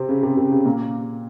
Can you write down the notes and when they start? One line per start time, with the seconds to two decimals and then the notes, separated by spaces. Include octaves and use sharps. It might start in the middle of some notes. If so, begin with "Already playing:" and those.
Already playing: C3 C4
0.09 C#3
0.23 C3
0.37 C3
0.51 C#3
0.65 A#2 A#3